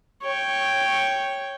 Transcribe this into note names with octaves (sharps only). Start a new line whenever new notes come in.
C#5 G5